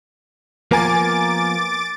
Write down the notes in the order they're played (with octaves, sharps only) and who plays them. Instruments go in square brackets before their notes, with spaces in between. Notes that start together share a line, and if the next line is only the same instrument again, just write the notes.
[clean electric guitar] F3 A#3 B3 [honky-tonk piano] A#4 G#5 [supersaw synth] D6 A6